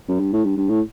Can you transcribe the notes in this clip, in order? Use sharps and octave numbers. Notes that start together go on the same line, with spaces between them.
F#2
G2
A2
G2
G2
A2